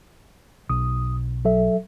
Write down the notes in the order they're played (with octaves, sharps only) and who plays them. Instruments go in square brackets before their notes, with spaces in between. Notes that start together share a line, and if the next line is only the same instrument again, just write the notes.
[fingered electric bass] B1 [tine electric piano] D#6
[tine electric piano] F#3 A4 E5